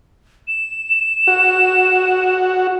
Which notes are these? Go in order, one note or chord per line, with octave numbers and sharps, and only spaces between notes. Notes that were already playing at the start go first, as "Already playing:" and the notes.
E7
F#4